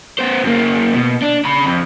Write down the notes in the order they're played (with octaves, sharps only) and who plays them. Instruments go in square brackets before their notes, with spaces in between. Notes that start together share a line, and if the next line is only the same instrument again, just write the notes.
[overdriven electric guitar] B3 C5
F#2 A#3
B2
D4
C#3 B5
F2